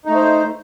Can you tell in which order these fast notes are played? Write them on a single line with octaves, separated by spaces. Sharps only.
D#4 A3 C5